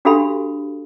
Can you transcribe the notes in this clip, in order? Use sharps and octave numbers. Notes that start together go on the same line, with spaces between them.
D4 F#4 G4 A4 F5 B5